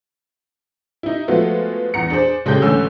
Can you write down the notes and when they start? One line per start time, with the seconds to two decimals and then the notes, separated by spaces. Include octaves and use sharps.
1.03 D#4 E4
1.28 F3 G#3 A3 B3 F4 F#4
1.94 E2 F#5 A#5 C#7
2.10 D4 G#4 C5
2.45 F#1 C#3 G#3 G4 A4 G6
2.62 A1 D3 C#4 G#5 E6